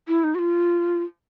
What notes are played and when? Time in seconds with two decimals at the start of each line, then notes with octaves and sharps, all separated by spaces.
0.08 E4
0.24 D#4
0.35 F#4
0.39 F4